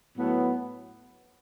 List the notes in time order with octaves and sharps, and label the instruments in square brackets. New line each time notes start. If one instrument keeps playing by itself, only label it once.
[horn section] A2 F#3 B3